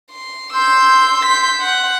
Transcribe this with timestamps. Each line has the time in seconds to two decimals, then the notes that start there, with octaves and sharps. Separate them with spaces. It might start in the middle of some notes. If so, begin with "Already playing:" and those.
0.12 C6
0.54 C6 E6 G6
1.26 G6 B6
1.61 F#5